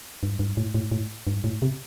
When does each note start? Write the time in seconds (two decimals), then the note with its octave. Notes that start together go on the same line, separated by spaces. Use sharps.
0.23 G2
0.39 G2
0.57 A2
0.74 A2
0.91 A2
1.27 G2
1.44 A2
1.62 C3